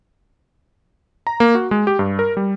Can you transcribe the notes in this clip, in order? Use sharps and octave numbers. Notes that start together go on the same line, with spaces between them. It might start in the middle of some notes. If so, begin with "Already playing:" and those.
A#5
A#3
F#4
G#3
G4
G2
A#4
G3